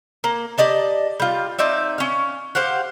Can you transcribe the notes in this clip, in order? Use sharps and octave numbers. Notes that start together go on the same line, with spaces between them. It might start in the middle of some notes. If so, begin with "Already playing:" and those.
A#3
G4 D5 D#5 A5
G3 F4
C4 D#4 D5 E5
C#4 F5
G4 C5 F5 F#5